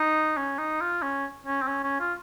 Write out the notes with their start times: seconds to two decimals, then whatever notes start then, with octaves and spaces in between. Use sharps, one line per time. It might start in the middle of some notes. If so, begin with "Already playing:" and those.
Already playing: D#4
0.37 C#4
0.58 D#4
0.81 F4
1.02 C#4
1.47 C#4
1.62 C4
1.67 C#4
1.84 C#4
2.00 F4